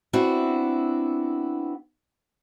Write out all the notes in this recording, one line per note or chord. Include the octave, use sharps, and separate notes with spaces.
B3 C4 D4 E4 F#4